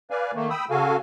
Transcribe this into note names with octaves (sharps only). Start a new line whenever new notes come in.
B4 D5 F5 G#5
D#3 A3 A#3
G5 B5 D#6 E6
C#3 F#4 A4 F5 G#5